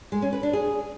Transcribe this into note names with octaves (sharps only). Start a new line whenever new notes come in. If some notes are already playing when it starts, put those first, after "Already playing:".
G#3
C#4
B4
D4
G#4